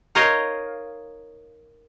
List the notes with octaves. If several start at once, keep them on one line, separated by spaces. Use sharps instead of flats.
D#4 F4 A#4 C#5 D#5 F5